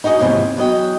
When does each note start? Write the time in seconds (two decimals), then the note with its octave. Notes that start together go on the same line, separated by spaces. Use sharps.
0.04 D#4 F#4 G#4 D#5
0.19 D#2 G#2 C3 E3 F3
0.57 E2 F#3 D#5 G5